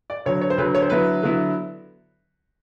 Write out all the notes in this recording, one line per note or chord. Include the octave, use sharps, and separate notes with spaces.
D5
D2 D3 F#3 C#5
C#5
C5
D2 D3 F#3 B4
C#5
C5
D3 F#3 B3 E4 B4
D3 F#3 B3 E4